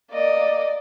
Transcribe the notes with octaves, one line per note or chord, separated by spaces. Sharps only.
A#3 D5 D#5